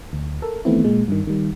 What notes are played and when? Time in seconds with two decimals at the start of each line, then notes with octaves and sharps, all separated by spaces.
0.13 D2
0.42 A4 A#4
0.65 D#3 E3 A3 B3 C4 E4
0.84 A#2 G#3
1.08 G2 D#3
1.27 D#3 G3